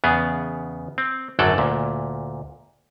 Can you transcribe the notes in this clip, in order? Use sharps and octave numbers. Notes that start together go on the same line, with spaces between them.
E2 C#3 B3 G#4
C4
G#1 F#2 D3 F#3 A4 D5
D2 A#2